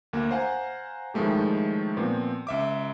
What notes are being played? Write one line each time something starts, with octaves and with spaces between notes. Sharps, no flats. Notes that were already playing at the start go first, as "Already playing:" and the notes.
D2 A#3
C5 F5 F#5 G#5 A#5
A2 D#3 F3 G#3 A3 G4
A#2 F3 B3 C4
C#2 E5 D6